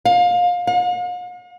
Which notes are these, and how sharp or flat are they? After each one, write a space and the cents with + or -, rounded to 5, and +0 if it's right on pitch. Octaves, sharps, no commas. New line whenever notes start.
F5 +25
F5 +45